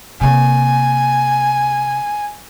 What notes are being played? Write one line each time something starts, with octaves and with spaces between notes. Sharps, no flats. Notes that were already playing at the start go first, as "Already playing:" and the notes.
C3 A#3 G#5